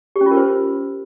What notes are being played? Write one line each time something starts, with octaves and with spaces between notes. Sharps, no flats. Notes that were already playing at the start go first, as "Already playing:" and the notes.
G4
C#4
F4
A#4
C5